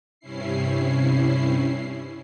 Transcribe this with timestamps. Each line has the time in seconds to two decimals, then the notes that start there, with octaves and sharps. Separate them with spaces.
0.20 G2 C3 C#4 E4 C7